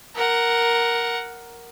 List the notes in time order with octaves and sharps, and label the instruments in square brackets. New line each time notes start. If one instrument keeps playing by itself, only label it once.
[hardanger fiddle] A#4 F#5